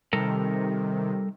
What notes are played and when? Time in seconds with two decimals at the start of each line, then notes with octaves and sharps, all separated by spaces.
0.13 C3 D#3 G3 A4 A#4